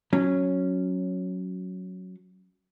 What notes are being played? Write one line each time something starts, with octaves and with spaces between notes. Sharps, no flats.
F#3 C#4